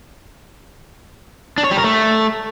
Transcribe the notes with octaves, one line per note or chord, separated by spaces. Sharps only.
D4
C#5
G3
A#4
A3